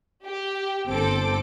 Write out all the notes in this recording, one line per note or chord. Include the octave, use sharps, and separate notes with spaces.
G4
G1 C4 A4 D6